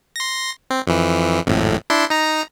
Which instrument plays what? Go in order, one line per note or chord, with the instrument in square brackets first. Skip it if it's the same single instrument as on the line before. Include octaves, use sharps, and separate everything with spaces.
[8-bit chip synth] C6 A#6
C4
F2 E3
G#1 F2 A2
D4 E4 C6
D#4 A#5